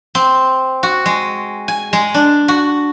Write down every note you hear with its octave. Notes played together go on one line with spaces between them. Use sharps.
C4
F#4
G#3
G#5
G#3
D4
F#4